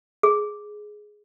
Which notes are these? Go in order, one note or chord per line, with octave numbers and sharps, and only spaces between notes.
G#4